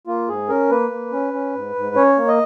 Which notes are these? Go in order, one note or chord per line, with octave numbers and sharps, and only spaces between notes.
A#3 F4
G#2 G#4
C#4 A#4
A#3 B4
A#3
C#4
C#4
G#2
G#2
C#4 C#5
A#3
D#5